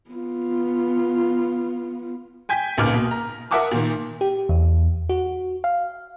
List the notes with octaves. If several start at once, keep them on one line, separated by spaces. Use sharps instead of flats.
B3 F4
G5 G#5 G6 B6
G#1 C#2 A#2 B4 D6 F6
B2 A#3
A#5
A#4 E5 F#5 A5 D6 D#6
A#2 D#3 A#3
G4
E2
F#4
F5